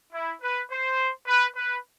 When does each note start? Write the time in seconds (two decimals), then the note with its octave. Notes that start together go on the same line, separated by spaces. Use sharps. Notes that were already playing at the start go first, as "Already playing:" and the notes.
0.13 E4
0.42 B4
0.71 C5
1.27 B4
1.56 B4